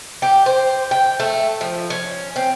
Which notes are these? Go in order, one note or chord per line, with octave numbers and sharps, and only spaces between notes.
G4
C5
G5
A3
F3
C#4
C4